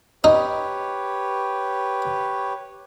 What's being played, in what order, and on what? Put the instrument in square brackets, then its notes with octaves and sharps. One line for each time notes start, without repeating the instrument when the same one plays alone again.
[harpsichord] D#4 [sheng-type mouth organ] G4 B4 C#5